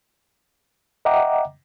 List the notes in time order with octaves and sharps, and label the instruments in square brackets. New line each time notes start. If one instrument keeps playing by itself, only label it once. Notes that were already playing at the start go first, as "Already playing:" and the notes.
[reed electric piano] D#5 E5 F#5 G5 A#5 D6